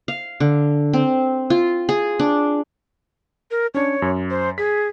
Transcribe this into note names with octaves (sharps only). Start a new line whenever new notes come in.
F5
D3
C4
F4
G#4
D4
A#4
C#4 D4 C#5
F#2
C5
G#4 B6